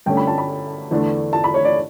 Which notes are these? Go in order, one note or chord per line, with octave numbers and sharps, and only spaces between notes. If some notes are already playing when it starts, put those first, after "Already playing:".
G2 D3 A3 C#4 G5
B5
A5
B5
E2 D3 A3 D4
A5
B5
C#5
D5